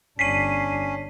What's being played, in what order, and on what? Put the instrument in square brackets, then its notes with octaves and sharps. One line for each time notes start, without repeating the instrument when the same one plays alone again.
[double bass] G1 D4 [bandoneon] C#4 [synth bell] B6 C7 D#7